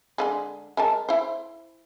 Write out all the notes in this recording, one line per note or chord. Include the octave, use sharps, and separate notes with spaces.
D3 F3 G#3
G#3 A#4 A5
E4 C5